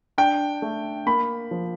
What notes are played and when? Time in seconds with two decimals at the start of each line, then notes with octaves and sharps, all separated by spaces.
0.18 D4 G5
0.62 A3
1.06 A#3 B5
1.51 F3